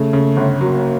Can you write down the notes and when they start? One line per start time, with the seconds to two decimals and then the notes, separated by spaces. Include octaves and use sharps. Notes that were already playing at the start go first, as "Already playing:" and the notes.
Already playing: C#3 A3
0.13 C#3
0.37 G1
0.61 F#3 A#3